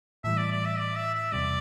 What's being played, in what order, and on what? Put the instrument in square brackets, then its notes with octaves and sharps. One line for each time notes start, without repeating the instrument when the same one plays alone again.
[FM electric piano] A2 E3 G3 [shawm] E5
[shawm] D5
D5
E5
D5
E5
E5
[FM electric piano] E2 C3 G3 [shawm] D5